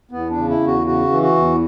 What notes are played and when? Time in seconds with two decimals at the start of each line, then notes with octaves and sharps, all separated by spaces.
0.11 E2 B3
0.30 D4
0.37 C#3
0.49 E4
0.61 E2
0.67 F#4
0.87 C#3 F#4
1.11 E3
1.23 F#4
1.36 E2